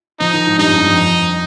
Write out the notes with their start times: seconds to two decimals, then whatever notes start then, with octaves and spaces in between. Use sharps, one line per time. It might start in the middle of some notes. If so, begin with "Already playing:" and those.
0.20 F3 D#4
0.33 D#3
0.47 G#2
0.58 G2 D#4
0.69 F2
0.78 G2
0.88 F2